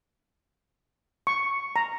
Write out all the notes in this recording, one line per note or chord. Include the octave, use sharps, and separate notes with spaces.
C#6
A#5